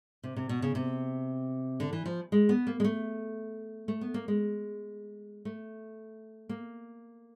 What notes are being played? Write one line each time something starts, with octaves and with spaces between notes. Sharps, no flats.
C3
C3
B2
C#3
C3
D3
E3
F3
G#3
B3
A#3
G#3
A3
A3
B3
A#3
G#3
A3
A#3